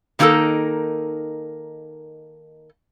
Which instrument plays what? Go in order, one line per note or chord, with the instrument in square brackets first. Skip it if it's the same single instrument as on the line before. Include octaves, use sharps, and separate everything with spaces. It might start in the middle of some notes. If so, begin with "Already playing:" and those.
[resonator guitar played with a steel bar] D#3 A#3 D#4 G4 A4 A#4